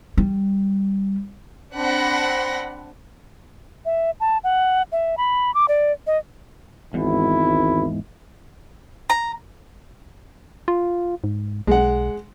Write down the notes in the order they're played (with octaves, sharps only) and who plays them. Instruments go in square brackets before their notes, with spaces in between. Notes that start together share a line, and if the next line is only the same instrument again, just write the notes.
[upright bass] G3
[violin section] C4 D4 F#5 B5 A#6
[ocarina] E5
A5
F#5
E5
B5
D6
D5
D#5
[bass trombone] G#1 [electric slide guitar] E2 G#2 [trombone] E4
[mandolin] A#5
[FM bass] F4
G#2
[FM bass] B1 [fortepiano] G#3 F#5